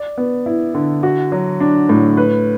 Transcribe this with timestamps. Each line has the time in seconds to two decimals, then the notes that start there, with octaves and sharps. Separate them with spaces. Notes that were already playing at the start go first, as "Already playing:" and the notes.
Already playing: D5
0.18 B3
0.46 E4
0.75 D3
1.03 F#4
1.32 F#3
1.60 D4
1.89 A2
2.17 B4